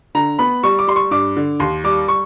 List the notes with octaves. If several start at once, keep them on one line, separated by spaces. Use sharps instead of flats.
D3 A#5
B3 B5
G3 C#6
D6
G3 C6
C#6
G2 D6
D3
D#2 C6
G3 D6
C#6